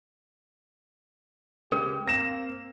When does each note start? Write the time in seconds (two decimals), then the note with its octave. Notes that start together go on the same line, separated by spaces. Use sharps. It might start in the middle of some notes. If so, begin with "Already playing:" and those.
1.72 C#3 G#3 C#4 G4 A#4
2.08 A#3 C4 A#6 E7